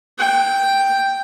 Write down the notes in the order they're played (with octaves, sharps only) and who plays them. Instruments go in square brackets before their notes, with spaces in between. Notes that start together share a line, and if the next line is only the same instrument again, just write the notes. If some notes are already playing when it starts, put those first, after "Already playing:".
[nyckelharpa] G5